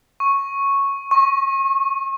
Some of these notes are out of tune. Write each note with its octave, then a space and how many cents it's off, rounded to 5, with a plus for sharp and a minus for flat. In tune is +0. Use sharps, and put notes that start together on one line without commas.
C#6 -5
C#6 -35